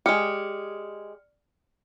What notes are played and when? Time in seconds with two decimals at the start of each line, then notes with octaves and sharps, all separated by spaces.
0.06 G#3 G4 D5 F6 C#7